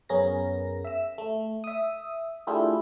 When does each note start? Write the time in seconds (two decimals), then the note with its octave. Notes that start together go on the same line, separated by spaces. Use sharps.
0.09 F#2 B3 C#4 G#4 A#4 A#6
0.85 E5 E6
1.18 A3
1.64 E5 D#6
2.47 A3 D4 E4 F4 G4 G#4